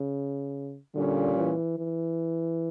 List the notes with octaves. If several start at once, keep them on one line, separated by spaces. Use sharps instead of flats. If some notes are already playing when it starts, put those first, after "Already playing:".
Already playing: C#3
A#2 D3 G3 A#3 C#4
E3
E3